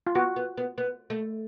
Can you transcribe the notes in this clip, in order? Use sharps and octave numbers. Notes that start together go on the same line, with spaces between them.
F4
B3 F#4
B3
B3
B3
A3